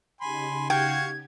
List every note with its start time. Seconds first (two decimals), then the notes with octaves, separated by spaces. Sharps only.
0.21 C#3 D#4 G4 G#5 B5 C6
0.70 F#4 F5 G5 C#6 G#6